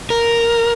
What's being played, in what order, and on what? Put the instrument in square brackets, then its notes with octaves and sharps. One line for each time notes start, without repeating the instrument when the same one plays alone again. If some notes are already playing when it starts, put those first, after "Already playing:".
[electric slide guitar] A#4